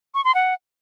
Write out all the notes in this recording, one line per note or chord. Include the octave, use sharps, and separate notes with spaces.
C#6
C6
F#5